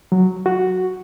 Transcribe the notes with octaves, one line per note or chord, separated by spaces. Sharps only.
F#3
F#4